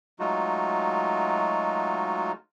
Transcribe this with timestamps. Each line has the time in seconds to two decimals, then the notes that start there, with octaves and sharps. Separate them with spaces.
0.19 F#3 G#3 A3 D#4 F4 F#4